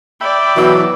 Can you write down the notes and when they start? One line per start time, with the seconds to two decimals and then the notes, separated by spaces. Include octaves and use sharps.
0.21 D5 E5 G5 B5
0.56 B2 E3 F#3 F#4